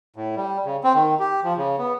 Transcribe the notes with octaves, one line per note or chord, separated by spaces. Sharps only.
A2
G3
C#3
C4
D#3
G4
F3
C#3
B3